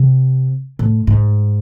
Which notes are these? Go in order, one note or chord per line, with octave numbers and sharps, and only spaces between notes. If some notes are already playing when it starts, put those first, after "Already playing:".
Already playing: C3
A2
G#2